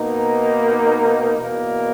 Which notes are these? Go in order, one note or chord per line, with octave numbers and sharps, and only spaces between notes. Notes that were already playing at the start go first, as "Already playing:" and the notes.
Already playing: B2 A#3 D#4
E2 B2 A#3